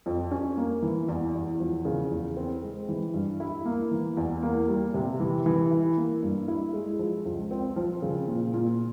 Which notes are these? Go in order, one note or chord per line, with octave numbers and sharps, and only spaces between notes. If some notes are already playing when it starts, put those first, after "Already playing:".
F2
C#4
A#3
E3
E2
E2
F3
C#3
E2
C4
G#3
E3
G2
E4
A#3
E3
E2
A#3
G3
C3
E3
E3
E4
A#3
G2
E4
G#3
F3
C#2
C4
F3
C#3
A#2
A#2